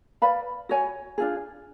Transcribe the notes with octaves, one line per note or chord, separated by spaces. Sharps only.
B4 D5 F5 B5
F#4 C#5 G#5
D4 F4 G#4